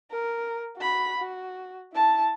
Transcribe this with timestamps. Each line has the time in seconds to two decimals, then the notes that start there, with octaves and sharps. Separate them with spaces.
0.11 A#4
0.77 F#4 B5
1.18 F#4
1.93 E4 A5